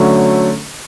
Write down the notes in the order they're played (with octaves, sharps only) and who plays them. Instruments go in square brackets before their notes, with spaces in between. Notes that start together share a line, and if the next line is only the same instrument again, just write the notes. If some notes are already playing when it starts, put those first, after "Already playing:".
Already playing: [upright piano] D3 F#3 A3 C#4